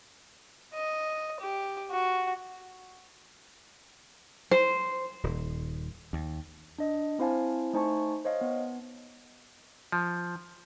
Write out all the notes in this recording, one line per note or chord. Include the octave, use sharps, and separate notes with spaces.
D#5
G4
F#4
C5
D#1
D#2
D4 D#5
C4 E4 C5 F5 G#5 A5
A3 D#4 C5 G#5 A5 C#6
C5 C#5 D#5 F5
B3
F3